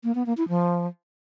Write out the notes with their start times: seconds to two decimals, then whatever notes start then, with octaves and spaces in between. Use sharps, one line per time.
0.04 A#3
0.15 B3
0.26 A#3
0.37 E4
0.49 F3